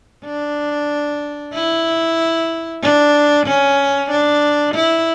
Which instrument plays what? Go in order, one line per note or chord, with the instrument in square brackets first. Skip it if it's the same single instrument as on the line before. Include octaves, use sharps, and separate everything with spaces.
[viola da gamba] D4
E4
D4
C#4
D4
E4